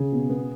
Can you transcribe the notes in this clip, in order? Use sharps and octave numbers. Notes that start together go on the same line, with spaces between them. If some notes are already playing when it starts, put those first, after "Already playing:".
Already playing: C#3 G#4
B2
B3